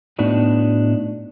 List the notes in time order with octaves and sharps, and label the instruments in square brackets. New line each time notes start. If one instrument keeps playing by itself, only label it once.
[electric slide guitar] A2 B3 D4 D#4 F#4